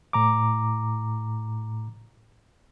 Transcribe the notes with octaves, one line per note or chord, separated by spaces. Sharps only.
A2 A#5 D6